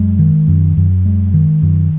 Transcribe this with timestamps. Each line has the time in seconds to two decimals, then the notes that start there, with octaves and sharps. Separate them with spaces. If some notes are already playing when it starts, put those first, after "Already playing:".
Already playing: F#2 G#3
0.19 D#3
0.48 F#2
0.77 F#2
1.06 G#3
1.34 D#3
1.62 F#2